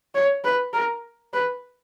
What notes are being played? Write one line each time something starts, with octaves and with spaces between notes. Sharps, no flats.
C#5
B4
A#4
B4